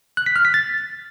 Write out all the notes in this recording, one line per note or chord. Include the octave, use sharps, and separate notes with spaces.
F#6
B6
F6
B6
A6